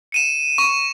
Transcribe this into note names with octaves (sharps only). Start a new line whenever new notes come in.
C#7 D#7 E7
C#6